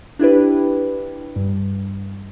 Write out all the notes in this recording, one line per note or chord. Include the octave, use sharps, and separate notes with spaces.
D4 E4 G4 B4
G2